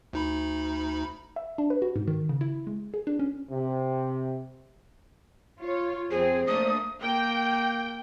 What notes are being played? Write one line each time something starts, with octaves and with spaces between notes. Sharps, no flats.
D2 D#4 B5
E5
D4
B4
F#4
G#2
D#3
C#3
E4
G#3
G#4
D4
C#4
C3
F4 C#5
F2 C4 G#4 C5
A3 A#3 D4 D#6
A#3 G5